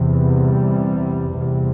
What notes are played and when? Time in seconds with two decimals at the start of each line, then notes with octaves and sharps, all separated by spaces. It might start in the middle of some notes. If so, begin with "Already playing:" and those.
Already playing: E2 C3
0.11 G3
1.38 E2 C3